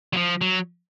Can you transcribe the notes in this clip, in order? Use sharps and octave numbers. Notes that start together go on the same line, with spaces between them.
F#3
F3
F#3